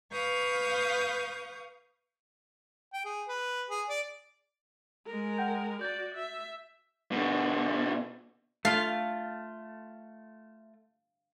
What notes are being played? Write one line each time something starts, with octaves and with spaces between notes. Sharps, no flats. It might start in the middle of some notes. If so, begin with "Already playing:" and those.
B4 F5 C#6 D#6 G6
G5
G#4
B4
G#4
D5
G#3 A#4
F#5 G5 G6
F#4 D5 G6 A6
E5
B2 D3
A3 F4 F5